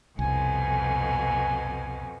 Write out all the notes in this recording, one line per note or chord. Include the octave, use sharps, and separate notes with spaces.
C2 F2 B2 G#5